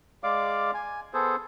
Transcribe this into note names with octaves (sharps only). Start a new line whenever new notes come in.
G#3 D5 F5 D6
G#5
B3 G#4 A4 C5